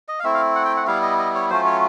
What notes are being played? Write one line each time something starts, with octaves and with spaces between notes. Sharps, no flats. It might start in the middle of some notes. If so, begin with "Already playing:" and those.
D#5
F5
A3 C4 E4 E5
F5
F#5
G5
F#5
G3 B3 E4 F5
D#5
D#5
C#5
F#3 A3 C#4 F4 C5
C#5